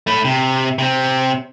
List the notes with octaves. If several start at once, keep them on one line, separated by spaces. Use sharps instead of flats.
A3 E4
C3
C3 C4